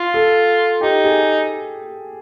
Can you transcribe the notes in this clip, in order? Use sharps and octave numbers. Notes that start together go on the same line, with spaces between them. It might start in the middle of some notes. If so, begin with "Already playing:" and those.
Already playing: F4
A4
D#4 G4
G#4